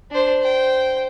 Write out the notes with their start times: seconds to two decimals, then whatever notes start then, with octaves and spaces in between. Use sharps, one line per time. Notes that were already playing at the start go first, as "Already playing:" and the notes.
0.11 D4 C5
0.41 C5 G5